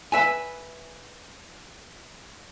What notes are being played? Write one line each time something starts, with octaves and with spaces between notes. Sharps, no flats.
B4 E5 G#5